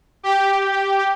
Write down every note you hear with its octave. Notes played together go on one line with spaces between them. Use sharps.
G4